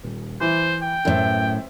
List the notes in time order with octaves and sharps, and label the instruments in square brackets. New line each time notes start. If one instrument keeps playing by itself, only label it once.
[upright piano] D#1
[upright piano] E3 E4 [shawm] C5
[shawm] G5
[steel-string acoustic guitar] F#2 A2 [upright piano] B4 C5 E5